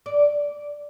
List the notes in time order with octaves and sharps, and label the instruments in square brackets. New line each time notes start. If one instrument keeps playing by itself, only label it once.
[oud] D5